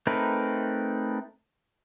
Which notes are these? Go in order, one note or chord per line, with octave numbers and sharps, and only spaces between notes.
A3 C4 D#4 A#4 B4